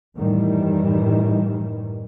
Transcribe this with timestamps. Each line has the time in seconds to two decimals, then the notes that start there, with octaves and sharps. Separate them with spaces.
0.16 F#2 A2 D#3 E3 G3